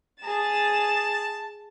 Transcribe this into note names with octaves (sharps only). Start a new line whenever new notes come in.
G#4 A5 A6 E7